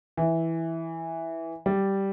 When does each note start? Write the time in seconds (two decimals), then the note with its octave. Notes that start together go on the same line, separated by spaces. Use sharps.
0.17 E3
1.66 G3